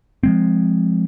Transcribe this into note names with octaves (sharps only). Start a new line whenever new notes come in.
F3 G#3 C4